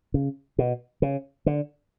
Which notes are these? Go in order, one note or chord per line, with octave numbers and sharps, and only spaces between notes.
C#3
B2
C#3
D3